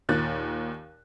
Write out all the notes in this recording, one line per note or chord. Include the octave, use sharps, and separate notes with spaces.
D#2 A#2 F#6 A6